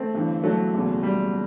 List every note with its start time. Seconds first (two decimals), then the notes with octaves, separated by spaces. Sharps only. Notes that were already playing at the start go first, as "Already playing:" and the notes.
Already playing: A3 C4
0.13 G1 G2 E3
0.44 F#3 A3
0.73 F#1 E2 B2
1.03 G3